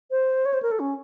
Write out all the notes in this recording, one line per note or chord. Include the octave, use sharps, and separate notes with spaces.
C5
C#5
C5
A#4
A4
C#4